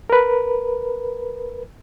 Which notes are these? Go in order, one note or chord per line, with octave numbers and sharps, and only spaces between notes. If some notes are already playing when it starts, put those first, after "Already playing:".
A#4 B4